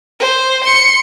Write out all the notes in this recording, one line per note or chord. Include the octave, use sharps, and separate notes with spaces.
C5
C6 C#7